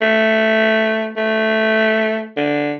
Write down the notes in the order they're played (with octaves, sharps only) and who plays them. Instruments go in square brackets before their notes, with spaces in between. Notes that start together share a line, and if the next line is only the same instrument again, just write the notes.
[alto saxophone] A3
A3
D3